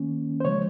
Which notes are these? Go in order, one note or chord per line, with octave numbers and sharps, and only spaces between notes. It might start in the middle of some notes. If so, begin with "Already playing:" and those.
Already playing: D#3 A#3 C#4
C5
C#3 F3 G#3 C#5